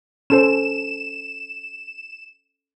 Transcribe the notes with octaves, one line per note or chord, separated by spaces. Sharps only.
C#4 A4 C5 E7